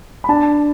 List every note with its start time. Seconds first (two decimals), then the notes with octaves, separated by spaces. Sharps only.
0.24 B5
0.29 D4 A5